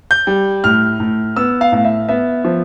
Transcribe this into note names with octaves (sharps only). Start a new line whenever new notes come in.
G6
G3
A2 F6
A2
B3 E6
F5
A2 F5
E5
B3 E5
F3